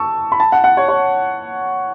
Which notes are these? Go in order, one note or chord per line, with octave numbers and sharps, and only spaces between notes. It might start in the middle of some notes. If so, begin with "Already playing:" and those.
Already playing: A5 C#6 E6
B5
A5
F#5
F#5
C#5
C#5